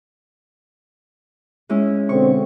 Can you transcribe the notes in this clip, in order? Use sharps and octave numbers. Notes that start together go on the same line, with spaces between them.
G#3 C#4 E4
B2 D3 C4 C#6